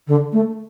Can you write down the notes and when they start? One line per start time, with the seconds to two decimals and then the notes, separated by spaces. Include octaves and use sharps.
0.07 D3
0.32 A3